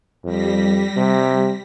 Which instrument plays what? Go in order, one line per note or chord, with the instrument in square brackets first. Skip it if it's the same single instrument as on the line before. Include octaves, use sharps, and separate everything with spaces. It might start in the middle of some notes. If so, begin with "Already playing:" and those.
[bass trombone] F2 [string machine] G3 A#6 B6
[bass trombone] C3